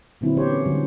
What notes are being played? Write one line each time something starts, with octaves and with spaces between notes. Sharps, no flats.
A#2 D3 F#3 B3 C4 E4
E3 B3 G4 C5 C#5
C#4
D3 F#3 G3